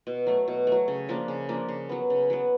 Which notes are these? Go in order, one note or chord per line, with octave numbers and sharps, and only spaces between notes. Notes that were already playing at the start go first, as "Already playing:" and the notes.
B2
F#3 A3
B2
F#3 A3
C#3
F3 A#3 D4
C#3
F3 A#3 D4
C#3
F#3 B3
C#3
F#3 B3